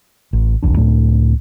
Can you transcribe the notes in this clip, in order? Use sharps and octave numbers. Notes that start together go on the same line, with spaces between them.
A1
F1 B1 E2 D4
C#2 A2 A3 D4